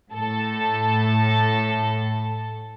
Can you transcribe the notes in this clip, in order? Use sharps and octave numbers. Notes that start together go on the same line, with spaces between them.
A2 A4